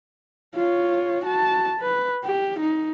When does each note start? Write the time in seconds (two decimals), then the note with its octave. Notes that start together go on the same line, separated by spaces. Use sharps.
0.56 F4 C#5
1.25 F#4 A5
1.81 B4
2.25 G4
2.60 D#4